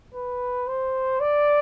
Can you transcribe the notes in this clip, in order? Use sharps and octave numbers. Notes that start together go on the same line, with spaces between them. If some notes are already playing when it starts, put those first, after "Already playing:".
B4
C5
D5